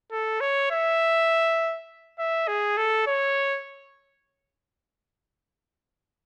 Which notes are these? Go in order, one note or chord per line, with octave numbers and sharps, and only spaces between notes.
A4
C#5
E5
E5
G#4
A4
C#5